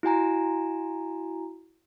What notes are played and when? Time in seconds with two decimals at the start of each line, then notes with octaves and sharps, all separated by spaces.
0.03 E4 F#4 G#5 A#5